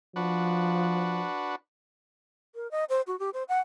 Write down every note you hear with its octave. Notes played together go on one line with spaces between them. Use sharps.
F3 D4 F#4 B4
A#4
D#5
C5
F#4
G4
C5
F#5